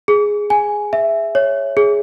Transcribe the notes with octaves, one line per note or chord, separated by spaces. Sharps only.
G#4
G#5
E5
C#5
G#4